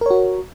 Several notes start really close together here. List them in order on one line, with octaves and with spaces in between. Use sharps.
A#4 C#5 F#4